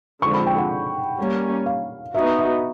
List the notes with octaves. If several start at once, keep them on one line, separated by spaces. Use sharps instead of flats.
D3 F3 G#3 C4 C#6
B5
G5
F#5
G3 A#3 C#4
F5
B3 D#4 F#4 E5
E5